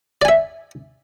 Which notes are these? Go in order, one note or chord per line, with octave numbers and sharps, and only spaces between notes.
D5 E5 G#5